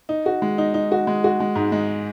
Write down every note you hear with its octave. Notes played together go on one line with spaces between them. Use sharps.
D#4
F#4
G#3
D#4
D#4
F#4
G#3
F#4
G#3
G#2
G#3